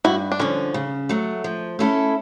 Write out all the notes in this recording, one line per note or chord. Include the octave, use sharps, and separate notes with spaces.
G2 E4 F#4
D4
D3 F3 C#4
C#3
F#3 A3
F3
A3 C#4 E4 A4